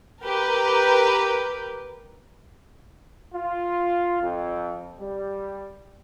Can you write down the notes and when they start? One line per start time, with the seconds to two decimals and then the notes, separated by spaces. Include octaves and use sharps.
0.23 G4 A#4 B4
3.34 F4
4.21 F2
5.00 G3